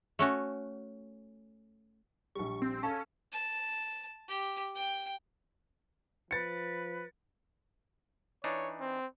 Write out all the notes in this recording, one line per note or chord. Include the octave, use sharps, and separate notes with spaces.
A3 C#4 F#4
A#1 G3 C#6
C4
C#4 A4 F5 A5
A5
G4
G5
F3 B4 A6 C#7
E3 D4 D#4 C#5
C4